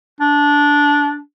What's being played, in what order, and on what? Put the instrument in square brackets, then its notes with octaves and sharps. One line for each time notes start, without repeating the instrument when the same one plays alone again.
[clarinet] D4